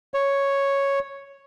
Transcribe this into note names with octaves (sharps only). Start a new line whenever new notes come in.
C#5